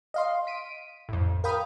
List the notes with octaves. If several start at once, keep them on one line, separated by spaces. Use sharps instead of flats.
D#5 F5 C6
B6 D7 D#7
A1 F2
A#4 F5 G5 B5 D#6